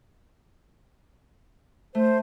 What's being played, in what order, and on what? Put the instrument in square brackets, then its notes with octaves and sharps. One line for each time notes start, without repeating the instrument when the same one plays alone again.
[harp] A3 [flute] C5